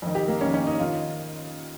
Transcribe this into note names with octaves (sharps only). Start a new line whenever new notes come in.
F2 D#3
G4
A#3
F2 D#3 C#4
C#4
D#4
D#3 F4